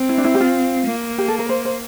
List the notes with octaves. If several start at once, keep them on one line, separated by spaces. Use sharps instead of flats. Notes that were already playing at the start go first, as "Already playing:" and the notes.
Already playing: C4
E4
D4
E4
G4
F4
A#3
G4
A4
A#4
C5
C5